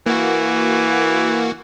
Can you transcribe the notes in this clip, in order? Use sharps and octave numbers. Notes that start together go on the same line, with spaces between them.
E3 A#3 F#4